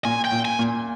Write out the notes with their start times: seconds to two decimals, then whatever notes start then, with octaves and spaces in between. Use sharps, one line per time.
0.05 A#2 G#5
0.25 G5
0.32 A#2
0.45 G#5
0.59 A#2